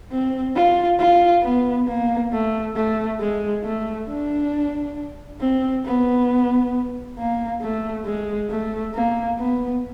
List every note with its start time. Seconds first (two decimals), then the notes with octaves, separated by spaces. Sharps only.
0.11 C4
0.56 F4
1.00 F4
1.43 B3
1.87 A#3
2.32 A3
2.76 A3
3.20 G#3
3.64 A3
4.09 D4
5.40 C4
5.85 B3
7.18 A#3
7.62 A3
8.06 G#3
8.50 A3
8.95 A#3
9.39 B3